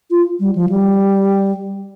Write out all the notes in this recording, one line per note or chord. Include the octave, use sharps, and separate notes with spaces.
F4
G3
F3
G3